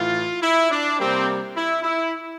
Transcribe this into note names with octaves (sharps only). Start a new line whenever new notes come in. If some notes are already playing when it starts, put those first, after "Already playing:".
Already playing: A2 E3 F4
E4
D4
C3 G3 A#3 C4
E4
E4